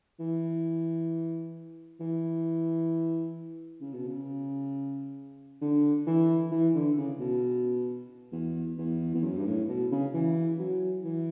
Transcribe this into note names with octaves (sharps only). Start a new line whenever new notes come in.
E3
E3
C#3
B2
C#3
D3
E3
E3
D3
C#3
B2
E2
E2
E2
F#2
G2
A2
B2
C#3
E3
F#3
E3